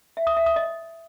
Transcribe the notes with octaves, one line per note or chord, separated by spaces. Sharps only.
E5
D#6
E5
D#6
D#5